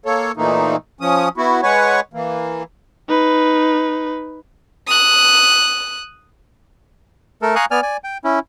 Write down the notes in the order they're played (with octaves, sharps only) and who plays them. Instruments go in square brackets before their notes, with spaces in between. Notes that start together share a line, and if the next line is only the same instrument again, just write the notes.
[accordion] A#3 A4 C#5
A#2 E3 A3 A#3 D#4
F3 C#4 D#6
B3 E4 F#4
G#3 B4 C#5 F#5 G#5 C#6
E3 A#3
[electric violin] D#4 B4
[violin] D#6 F#6
[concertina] A3 A4 A#4
F5 G#5 A#5 C#6 D#6 F#6
B3 D5 G#5 F6
D5 G#5
G5
C#4 E4